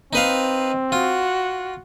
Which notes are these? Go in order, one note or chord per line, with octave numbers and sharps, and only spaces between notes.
C4 D#4 B4 F5
F4 F#4